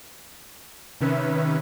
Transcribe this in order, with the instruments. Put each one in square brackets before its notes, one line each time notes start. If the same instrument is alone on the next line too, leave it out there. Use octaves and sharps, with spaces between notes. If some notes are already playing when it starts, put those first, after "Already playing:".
[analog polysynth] C3 D#3 C#4 B4 E5